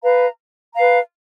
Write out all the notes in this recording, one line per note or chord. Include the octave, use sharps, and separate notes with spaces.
B4 F5 A#5
B4 F5 A#5